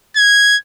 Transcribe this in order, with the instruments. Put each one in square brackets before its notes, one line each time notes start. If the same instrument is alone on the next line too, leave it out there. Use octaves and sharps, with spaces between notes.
[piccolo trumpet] G#6